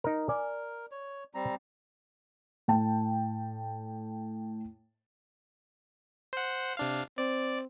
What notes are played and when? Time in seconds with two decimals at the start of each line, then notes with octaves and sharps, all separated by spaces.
0.04 D#4 A#4
0.29 A#4 D5 G#5
0.92 C#5
1.34 G3 C4 A#5
2.68 A2 G5 A5
6.33 C5 F#5
6.77 C3 D4 F5
7.18 C4 D5